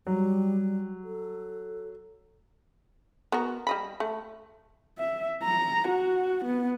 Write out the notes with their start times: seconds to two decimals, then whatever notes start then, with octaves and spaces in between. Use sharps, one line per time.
0.07 F#3 G3
1.04 A4
3.32 B3 F#4 A#4
3.67 G3 D#5 B5
4.00 A3
4.98 E5
5.44 A#5
5.88 F#4
6.45 B3